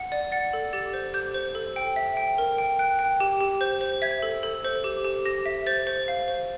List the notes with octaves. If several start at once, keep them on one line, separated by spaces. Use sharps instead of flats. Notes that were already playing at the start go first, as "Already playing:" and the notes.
Already playing: F#5
D5
F#5 A6
A4
G4 A6
C5
G4 G6
C5
A4
G5
E5
G5
A#4
G5
G5 F#6
G5
G4
G4
C5 G6
C5
E5 G#6
A4
A4
C5
G4
G4
G4 A#6
E5
C5 A6
C5
F5
C5